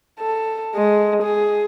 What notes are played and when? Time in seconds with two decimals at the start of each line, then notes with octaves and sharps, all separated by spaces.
0.20 A4
0.75 G#3
1.23 G#4